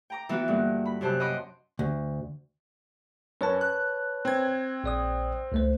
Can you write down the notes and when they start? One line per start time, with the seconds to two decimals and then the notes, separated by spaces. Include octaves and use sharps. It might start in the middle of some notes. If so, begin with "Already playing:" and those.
0.10 G5 A#5 D6
0.29 E3 B3 F4 F#4
0.48 G2 D3 A#3
0.86 B5
1.01 F#2 C3 G4 C5 A5 F#6
1.19 C5 D#5 F#5 B5 C6 D6
1.79 D2
3.41 F#2 C#4 B4 C#5 A5
3.61 F#6
4.25 C4 G#6
4.84 A#1 D5 D#6
5.52 C#2 A3 C5